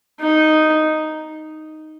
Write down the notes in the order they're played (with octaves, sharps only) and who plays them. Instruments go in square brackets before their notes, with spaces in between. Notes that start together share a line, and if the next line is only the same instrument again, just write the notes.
[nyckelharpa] D#4